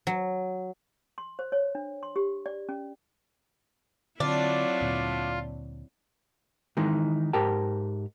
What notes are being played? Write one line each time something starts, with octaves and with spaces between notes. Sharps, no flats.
F#3
C6
C5
C#5
D4
C6
G4
D5
C#4
D3 F#3 C4 D4 E4 F4
D2 A#2
D#3 E3 G#3 D#4
G#2 G4 A#4 G5 A5